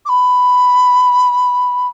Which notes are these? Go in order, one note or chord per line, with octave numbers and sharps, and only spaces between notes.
D6
B5